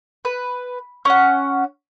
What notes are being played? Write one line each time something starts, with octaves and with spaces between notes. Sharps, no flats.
B4
C#4 F#5